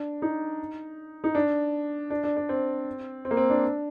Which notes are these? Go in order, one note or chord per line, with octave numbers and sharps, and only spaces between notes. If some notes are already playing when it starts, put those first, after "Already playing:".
Already playing: D4
D#4
D#4
D4
D4
D4
D4
C4
C4
A#3
C4
D4